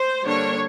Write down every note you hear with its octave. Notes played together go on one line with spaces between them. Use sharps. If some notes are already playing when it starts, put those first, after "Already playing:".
Already playing: C5
D3 G3 A#3 D4 C#5